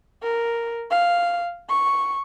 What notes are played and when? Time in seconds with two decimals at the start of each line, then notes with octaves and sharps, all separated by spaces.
0.23 A#4
0.91 F5
1.69 C#6